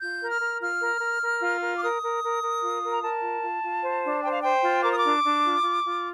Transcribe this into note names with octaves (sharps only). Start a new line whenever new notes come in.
F4 G6
A#4
F6
A#4
F4 F6
A#4
A#4
A#4
F4
A#4
D6
A#4 D#6
A#4
A#4
A#4
F4
A#4
A#5
A#4 A5
F4
F4
F4
C5
D4
C5 G5
F5
C5 G5
F4
A#4 D6
D#6
D6
D4
D4
F4
F4
F4